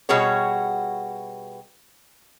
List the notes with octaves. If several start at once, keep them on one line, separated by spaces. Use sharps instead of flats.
B2 G3 F#4 G#4 C#5